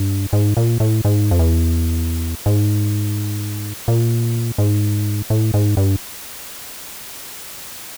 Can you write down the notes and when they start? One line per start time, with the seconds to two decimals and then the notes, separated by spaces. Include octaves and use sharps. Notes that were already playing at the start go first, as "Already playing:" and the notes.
Already playing: G2
0.33 G#2
0.57 A#2
0.80 A2
1.05 G#2
1.31 F2
1.39 E2
2.46 G#2
3.88 A#2
4.58 G#2
5.30 A2
5.54 G#2
5.77 G2